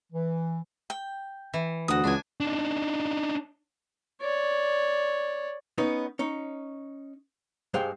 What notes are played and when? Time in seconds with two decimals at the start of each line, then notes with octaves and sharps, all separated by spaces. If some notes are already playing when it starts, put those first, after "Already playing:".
0.12 E3
0.90 G5
1.54 E3
1.88 D2 F#4 D#6
2.04 C#2 D4 G#5
2.40 D4 D#4
4.22 C#5 D5
5.78 B3 C#4 D#4
6.19 C#4 D#4
7.74 G2 G#3 C5 F5 G5